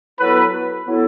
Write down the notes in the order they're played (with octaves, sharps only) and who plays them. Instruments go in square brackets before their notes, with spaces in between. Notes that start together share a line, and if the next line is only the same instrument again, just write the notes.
[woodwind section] F#3 B3 E4 A4 [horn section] B4
[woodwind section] F#3 B3 E4 A4